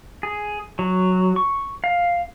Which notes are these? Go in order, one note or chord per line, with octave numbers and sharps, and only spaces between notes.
G#4
F#3
C#6
F5